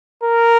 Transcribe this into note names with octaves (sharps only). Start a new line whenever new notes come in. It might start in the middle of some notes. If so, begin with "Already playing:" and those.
A#4